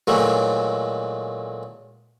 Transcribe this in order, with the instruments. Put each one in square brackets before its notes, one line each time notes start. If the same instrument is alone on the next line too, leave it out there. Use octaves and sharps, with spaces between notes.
[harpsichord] A#2 D#3 E3 F#3 G#3 A3